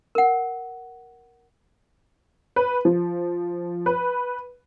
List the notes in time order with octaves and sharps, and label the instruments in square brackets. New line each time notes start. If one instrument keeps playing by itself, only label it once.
[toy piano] A#4 F#5
[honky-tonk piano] B4
F3
B4